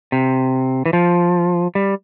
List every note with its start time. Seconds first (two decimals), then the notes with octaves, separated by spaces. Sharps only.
0.12 C3
0.86 E3
0.93 F3
1.75 G3